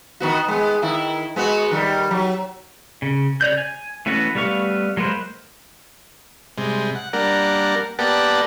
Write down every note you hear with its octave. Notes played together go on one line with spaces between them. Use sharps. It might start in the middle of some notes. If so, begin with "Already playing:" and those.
D#3 B3 F#4
G#3 B3
D#3 E4
G#3 B3 F#4
D#3 G3
F#3
C#3
C#3 C#5 D5 G6
G#5
E3 A3 B3 C#4 F#4
G3 A3 B3 F5 C#6
F#3 G#3 A#3 B4 C5
C3 G3 G#3
F#5
G3 A#3 D4 A#4 F#5
A#3 B3 G4 D5 F#5 A5